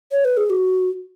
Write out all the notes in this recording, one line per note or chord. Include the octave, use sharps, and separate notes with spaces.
C#5
B4
G#4
F#4